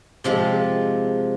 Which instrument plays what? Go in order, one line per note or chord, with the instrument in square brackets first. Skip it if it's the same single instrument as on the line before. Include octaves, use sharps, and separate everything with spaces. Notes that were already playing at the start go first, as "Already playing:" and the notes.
[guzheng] C3 F3 G#3